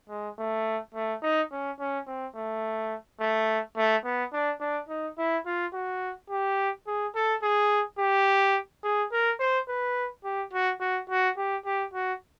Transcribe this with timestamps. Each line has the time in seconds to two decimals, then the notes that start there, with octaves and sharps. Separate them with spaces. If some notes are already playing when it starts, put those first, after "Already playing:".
0.09 G#3
0.39 A3
0.94 A3
1.22 D#4
1.51 C#4
1.79 C#4
2.07 C4
2.36 A3
3.20 A3
3.77 A3
4.04 B3
4.33 D4
4.60 D4
4.89 D#4
5.18 E4
5.46 F4
5.73 F#4
6.30 G4
6.87 G#4
7.15 A4
7.42 G#4
7.99 G4
8.83 G#4
9.12 A#4
9.40 C5
9.68 B4
10.24 G4
10.53 F#4
10.80 F#4
11.10 F#4
11.37 G4
11.65 G4
11.94 F#4